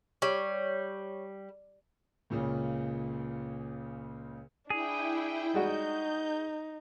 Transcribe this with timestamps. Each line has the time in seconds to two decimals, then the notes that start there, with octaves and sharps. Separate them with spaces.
0.22 G3 C#5
2.30 C#2 A#2 C#3 C#4
4.70 D4 E4 G#4 G5
5.54 G3 G#3 D#4 F#4 G6